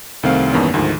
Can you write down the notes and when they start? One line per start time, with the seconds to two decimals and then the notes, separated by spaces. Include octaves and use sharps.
0.23 C2 D#3 A3 C4 F5
0.52 E2 G2 D#3 A#3 B3 C#4
0.74 D2 G#2 D#3 F3